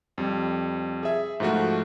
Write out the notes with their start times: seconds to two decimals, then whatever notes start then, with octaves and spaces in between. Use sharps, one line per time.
0.18 F2 G3
1.03 G#4 E5
1.40 G#2 F3 A3 F#4